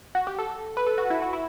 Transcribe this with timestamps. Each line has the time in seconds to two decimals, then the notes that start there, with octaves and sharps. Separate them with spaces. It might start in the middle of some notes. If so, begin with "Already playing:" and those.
0.15 F#4
0.27 G4
0.39 A4
0.77 B4
0.87 A4
0.98 F#4
1.10 E4
1.22 F#4
1.33 E4